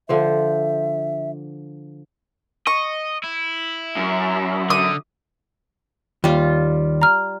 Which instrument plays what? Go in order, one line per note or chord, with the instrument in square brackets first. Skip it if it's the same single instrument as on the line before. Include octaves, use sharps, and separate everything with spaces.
[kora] D3 F3 C5 [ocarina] E5
[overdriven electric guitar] D#5 [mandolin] C#6
[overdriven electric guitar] E4
[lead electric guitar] F#2
[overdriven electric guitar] D3 [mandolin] D#6
[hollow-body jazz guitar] D#2 [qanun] G3 F4
[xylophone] A#5 F6